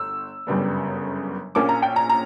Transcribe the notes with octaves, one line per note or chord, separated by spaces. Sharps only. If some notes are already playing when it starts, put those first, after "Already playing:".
Already playing: G1 E6
G1 F#2 C#3 G3 B3
A#1 A#2 A#3 C#4 D6
A#5
G5
A#5
A#5